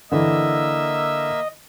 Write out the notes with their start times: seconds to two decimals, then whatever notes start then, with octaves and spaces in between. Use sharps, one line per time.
0.12 D3 E3 A#3 D#5 E5 E6